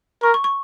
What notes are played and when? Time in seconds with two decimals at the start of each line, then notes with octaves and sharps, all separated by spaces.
0.23 A#4 C#6
0.34 C#6
0.44 C#6